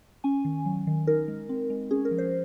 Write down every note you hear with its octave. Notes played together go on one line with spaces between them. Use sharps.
C#4 G#5
D#3
F#3
D#3
D#4 A#4
G#3
C4
G#3
C#4 G#4
A#4
F3
C5